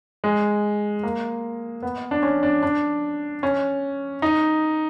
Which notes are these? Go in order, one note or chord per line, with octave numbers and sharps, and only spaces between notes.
G#3
A#3
B3
D4
C#4
D4
D4
C#4
D#4